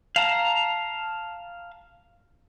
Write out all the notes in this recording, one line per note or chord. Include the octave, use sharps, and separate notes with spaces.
F5 A5 A#5